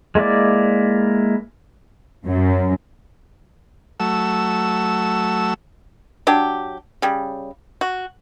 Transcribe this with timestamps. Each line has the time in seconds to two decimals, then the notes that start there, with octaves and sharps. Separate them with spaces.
0.15 G#3 A#3 E4 D5
2.26 F#2
4.00 F#3 A3 E6
6.27 F#3 D4 G4
7.02 C#3 G3
7.81 F#4